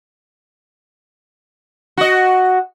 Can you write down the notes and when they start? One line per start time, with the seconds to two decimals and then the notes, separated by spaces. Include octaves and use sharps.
1.97 F#4 D#5